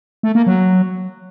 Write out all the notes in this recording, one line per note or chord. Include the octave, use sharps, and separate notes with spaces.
A3
A#3
F#3